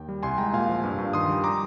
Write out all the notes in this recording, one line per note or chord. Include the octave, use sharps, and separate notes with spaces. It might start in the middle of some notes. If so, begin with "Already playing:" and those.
Already playing: D#2 G5
G3
C2 G#5 C6
G#3 G5 A#5
A#2 F5 G#5
F3
G2
G2
D#3 C6 D#6
G3
A#5 D6